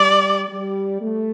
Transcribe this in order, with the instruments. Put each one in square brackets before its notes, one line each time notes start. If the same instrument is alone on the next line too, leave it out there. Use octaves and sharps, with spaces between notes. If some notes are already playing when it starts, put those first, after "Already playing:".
Already playing: [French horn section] G3 [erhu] D5
[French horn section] G3
A3